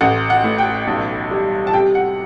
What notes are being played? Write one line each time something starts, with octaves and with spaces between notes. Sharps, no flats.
A1 F#5
F#5
A2
G5
B1
G3
A5
C3 G5
F#5